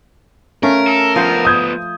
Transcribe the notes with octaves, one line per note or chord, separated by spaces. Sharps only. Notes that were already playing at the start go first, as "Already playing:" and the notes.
A3 C#4 A#4 F5
A4
F3 B3 F4 C5
D#6 G6 G#6